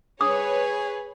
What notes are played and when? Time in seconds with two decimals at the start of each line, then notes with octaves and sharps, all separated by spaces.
0.21 G#4 B4 C#5 D#6